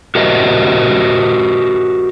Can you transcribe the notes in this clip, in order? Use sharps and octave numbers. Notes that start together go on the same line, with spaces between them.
F#4 G4 A#4 C5 D#5 E5